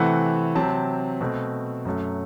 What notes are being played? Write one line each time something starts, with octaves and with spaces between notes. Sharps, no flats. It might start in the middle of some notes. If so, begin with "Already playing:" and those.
Already playing: C3 E3 A3 C4 F#5
C3 F#3 C4 A5
B2 A3 C4
F#2 F#3 A3